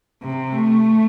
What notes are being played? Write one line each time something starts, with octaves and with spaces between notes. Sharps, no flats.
C3
A3